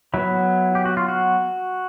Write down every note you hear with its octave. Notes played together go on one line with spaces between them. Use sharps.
F#3 B3 E4
G4
F#4
F4
F#4